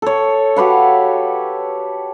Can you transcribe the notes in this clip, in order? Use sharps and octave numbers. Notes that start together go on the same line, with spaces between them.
A4 C#5
F#4 G4 B4 F5